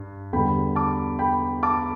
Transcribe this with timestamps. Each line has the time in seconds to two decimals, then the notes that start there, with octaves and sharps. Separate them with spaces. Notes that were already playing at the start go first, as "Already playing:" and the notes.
Already playing: G2
0.33 E2 D3 G3 G5 B5
0.75 A5 D6
1.19 G5 B5
1.63 A5 D6